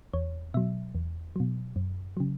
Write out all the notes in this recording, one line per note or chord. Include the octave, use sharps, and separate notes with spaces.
E2 C#5
B2 F#3 E5
E2
B2 F#3
F#2
C#3 F#3